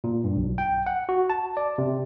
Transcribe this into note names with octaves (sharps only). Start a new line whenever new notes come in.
A#2
G2
B1
G5
F#5
F#4
A5
D5
C3